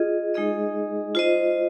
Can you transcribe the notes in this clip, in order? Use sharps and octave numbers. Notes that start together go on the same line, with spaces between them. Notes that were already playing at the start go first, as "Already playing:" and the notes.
Already playing: F4 G#4 D#5
G#3 D#4 G#4 D#5
F4 C5 D#5